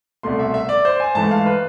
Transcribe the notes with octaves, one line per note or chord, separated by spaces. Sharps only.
C2 B2 A3 C6
E5
E5
D5
C5
G#5
G#2 E3 A3 A5
F5
B4